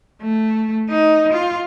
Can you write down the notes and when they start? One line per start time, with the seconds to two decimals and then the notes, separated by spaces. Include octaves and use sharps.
0.21 A3
0.90 D#4
1.33 F4